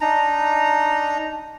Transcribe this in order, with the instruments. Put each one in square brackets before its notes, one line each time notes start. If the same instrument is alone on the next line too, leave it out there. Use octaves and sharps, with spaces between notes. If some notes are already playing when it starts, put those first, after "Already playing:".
[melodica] D4 D#4 A#5